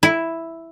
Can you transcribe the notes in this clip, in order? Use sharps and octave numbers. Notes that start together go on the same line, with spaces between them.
E4